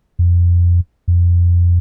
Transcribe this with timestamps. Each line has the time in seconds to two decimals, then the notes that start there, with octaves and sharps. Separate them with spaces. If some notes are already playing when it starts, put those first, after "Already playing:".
0.19 F2
1.08 F2